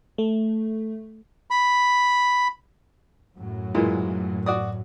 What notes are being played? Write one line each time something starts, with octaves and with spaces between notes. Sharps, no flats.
A3
B5
F#2 A2 F#3
A#2 E3 G#3
F#4 D5 D#6